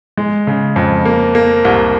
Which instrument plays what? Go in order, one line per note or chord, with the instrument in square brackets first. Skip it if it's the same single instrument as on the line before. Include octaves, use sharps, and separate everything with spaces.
[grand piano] G#3
C#3
F2
A#3
A#3
C2